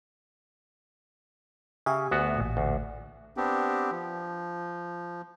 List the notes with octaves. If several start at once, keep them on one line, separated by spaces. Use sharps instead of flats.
C#3 G4 E5 G#5
D2 B3 F#4
A1 A#2
D2
B3 C4 D4 G4
F3